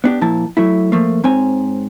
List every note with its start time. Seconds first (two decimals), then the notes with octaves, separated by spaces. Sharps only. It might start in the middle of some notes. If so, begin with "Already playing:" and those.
0.04 B3 D4 G4
0.21 A#2 F3 E4 A5
0.57 F#3 A3 E4
0.92 F3 A3 A#3
1.24 G#2 C4 C#5 G#5